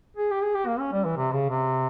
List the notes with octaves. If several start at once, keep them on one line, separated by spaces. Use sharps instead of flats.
G#4
G4
G#4
G4
A#3
C#4
G3
E3
C3
C#3
C3